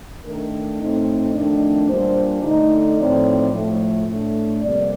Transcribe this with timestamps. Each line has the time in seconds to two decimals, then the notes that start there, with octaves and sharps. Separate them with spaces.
0.23 D#3 A3 D4 A#4
0.79 A2 A3 C4 D#4
1.33 F2 D#3 A3 D4
1.88 A#2 G3 D4 C5
2.42 D3 A3 D#4
2.97 A2 F3 C4 D#4 D5
3.52 A2 F3 A3
4.06 A2 A3 D4
4.61 F2 C3 G3 A#3 D5